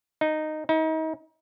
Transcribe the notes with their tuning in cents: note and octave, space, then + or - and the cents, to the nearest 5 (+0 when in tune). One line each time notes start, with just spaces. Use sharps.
D#4 -10
D#4 +35